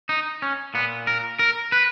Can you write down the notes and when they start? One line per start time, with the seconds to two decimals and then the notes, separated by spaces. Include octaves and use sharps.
0.09 D#4
0.42 C#4
0.74 A#2 B3
1.07 A#4
1.39 A#4
1.72 B4